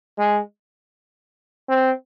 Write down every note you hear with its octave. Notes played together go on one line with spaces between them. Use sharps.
G#3
C4